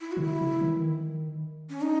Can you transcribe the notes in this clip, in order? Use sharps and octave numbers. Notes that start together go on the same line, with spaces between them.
E4
C#3 F#4
D#3 E4
C#3
D#3
E3
D#3
C#4
D#4